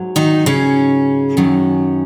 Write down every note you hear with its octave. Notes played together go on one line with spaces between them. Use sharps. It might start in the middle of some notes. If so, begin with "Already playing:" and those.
Already playing: G#2 F#3
D#3 D#4
C#3 C#4
F#2 D#3 F#3